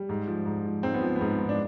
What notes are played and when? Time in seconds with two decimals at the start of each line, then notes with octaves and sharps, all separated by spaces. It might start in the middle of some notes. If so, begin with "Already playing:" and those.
Already playing: G3
0.09 G#2
0.27 F3
0.46 G#2
0.66 F3
0.83 G#2 C4
0.94 B3
1.01 F3
1.16 B3
1.21 G#2
1.38 G#2
1.49 D4